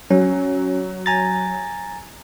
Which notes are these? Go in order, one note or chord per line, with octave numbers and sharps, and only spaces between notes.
F#3 C#4
G#5 A#5 A6